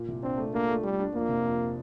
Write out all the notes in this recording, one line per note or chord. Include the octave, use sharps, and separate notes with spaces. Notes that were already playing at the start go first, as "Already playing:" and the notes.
Already playing: A#2
C2
C4 D4
A3
A#3 D4
A3
G3 A3
D4
F2 A#3
C3
F2